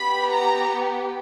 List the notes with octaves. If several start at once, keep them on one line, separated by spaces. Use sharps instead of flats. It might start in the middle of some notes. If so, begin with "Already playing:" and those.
Already playing: B3 G4 B5
A#5